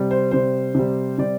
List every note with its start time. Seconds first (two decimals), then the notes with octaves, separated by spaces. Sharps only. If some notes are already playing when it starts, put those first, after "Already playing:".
Already playing: C3 G3
0.11 C5
0.31 C3 G3 C5
0.75 C3 G3
1.18 C3 G3 D5